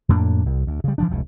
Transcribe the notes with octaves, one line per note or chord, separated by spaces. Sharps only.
F2 A2 A#3 D4
C2
D2
C#3 G3
E3 F3 D4
F1 C#2 B2